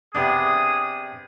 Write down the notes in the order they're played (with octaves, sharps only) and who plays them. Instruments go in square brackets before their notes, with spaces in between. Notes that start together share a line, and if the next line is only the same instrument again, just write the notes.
[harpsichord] C3 B3 D4 [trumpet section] G#4 D#6